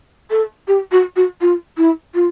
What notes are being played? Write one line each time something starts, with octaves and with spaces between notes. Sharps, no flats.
A4
G4
F#4
F#4
F4
E4
F4